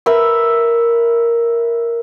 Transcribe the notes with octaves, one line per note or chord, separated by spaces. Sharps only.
A#4 B4 E5 E6